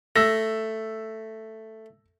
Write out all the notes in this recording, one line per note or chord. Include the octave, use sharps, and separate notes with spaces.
A3 E6 A#6